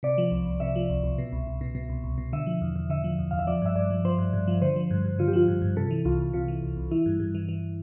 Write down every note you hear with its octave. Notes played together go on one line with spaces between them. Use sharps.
C3 D5
F3
C2
C2
C3 E5
F3
C2
C2
B2
C2
C2
B2
B2
C2
C2
B2
D3 E5
F3
E2
E2
D3 E5
F3
E2
E2 F5
E5
F3 D5
G2 E5
G2 D5
F3
F3 C5
G2
G2
F3
D3 C5
F3
G2
G2
D3 F4
G4
F3 F4
G2
G2
C3 A4
E3
C2 F4
C2
C3 F4
E3
C2
C2
E3 E4
G2
G2
E3
E3